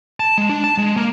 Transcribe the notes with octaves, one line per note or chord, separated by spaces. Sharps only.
A5
G#3
D4
A5
G#3
A#3